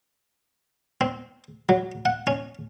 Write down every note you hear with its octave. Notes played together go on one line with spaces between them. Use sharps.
C4
F#3
F#5
C#4